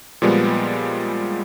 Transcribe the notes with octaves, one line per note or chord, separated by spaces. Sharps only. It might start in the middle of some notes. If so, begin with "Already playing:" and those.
A#2 F3 G3 G#3 B3